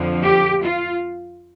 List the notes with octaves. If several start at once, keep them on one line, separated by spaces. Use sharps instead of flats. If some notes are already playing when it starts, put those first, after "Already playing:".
Already playing: F2 D3 F3
G4
F4